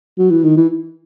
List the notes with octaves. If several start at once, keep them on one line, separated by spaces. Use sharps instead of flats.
F#3
E3
D#3
E3